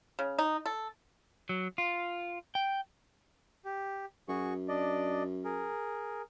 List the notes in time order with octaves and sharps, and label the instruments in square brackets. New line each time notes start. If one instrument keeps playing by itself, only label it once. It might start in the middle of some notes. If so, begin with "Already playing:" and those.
[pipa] C#3
D#4
A4
[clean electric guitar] F#3
F4
G5
[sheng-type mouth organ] G4
[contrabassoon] F#2 [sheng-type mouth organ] F#4 G#4 C#6
[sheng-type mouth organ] D4 D5 D#5
G#4 A#4